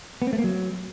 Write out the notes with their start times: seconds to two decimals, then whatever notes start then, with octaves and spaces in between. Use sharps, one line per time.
0.22 B3
0.27 C4
0.33 A3
0.38 A#3
0.44 F#3